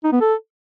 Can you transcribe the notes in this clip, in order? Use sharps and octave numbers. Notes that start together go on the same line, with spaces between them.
D#4
B3
A4